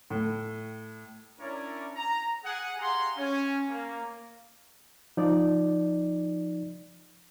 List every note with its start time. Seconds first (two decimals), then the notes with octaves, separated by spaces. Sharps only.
0.10 A2
1.39 C#4 D4 E4 A#4 C#5 D5
1.95 A#5
2.44 G#4 F#5
2.79 G4 G#4 F5 F#5 A#5 C6
3.17 C#4
3.69 A#3
5.17 F3 D#4 D5